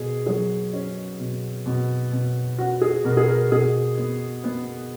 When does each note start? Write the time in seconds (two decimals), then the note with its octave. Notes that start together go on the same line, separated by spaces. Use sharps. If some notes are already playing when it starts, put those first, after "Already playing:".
Already playing: B2 G#4
0.26 F#3 G#4
0.73 C#4
1.20 B2
1.66 B2
2.12 B2
2.58 C#4 F#4
2.81 G#4
3.04 B2 A#4
3.17 G#4
3.28 A#4
3.51 B2 G#4
3.97 B3
4.44 B3